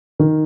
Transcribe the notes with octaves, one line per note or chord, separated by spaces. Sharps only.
D#3